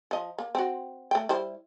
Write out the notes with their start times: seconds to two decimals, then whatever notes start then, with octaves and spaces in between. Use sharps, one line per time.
0.11 F3 D#5
0.38 A#3
0.55 C4 F#4
1.11 A3 G5
1.29 G3 E4 C5